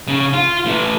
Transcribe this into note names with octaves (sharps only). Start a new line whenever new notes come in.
C#3
F4
A2 E3